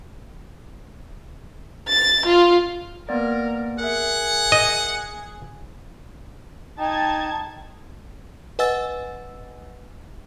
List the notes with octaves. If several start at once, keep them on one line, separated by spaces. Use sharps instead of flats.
A6
F4
A#3 B3 A#4 D5
G#4 A#4 E5 F#5
D#5
D#4 G5 A5 G#6
B4 D#5 F#5 G#5 E6 A6